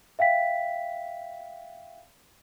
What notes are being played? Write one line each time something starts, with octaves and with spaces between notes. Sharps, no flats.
E5 F5 G5 B6